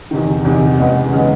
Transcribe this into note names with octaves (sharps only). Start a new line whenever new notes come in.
E2 C3 D#3
E2 C3 D#3
E2 C#3 E3 G#3 B3
C#3 E3 G#3 B3